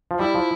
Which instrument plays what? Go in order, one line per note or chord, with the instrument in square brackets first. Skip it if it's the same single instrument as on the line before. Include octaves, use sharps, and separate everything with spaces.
[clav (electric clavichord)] F3
[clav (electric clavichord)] G3 [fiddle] E4
[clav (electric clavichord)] F3